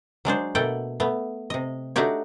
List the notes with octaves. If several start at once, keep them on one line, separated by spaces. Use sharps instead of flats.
F#3 G#3 D4 C5
B2 A3 A#3 A4 F#5 G5
A3 B3
C3 D#5
A3 D4 D#4 F#4 G4 C#5